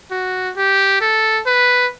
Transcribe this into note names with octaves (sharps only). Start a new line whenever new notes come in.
F#4
G4
A4
B4